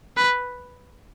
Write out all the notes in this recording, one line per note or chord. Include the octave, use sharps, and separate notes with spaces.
B4